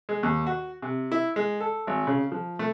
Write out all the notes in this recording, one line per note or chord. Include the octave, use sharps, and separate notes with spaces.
G#3
D#2
F#4
C3
E4
G#3
A4
G#1
C#3
F3
A3